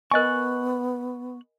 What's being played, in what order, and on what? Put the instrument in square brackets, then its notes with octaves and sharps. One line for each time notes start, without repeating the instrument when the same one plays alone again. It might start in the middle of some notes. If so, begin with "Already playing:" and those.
[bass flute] B3 [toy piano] A#4 D#5 G#5 [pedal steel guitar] C#6 F#6